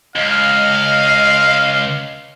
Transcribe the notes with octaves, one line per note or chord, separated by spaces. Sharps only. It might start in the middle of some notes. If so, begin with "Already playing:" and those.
C#2 D#5 F5